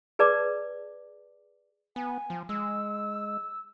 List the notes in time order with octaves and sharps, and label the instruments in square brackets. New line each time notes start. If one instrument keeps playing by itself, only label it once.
[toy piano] G#4 B4 D5 A5 D6
[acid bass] B3 [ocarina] G#5
[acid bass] F3
[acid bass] G#3 [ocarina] E6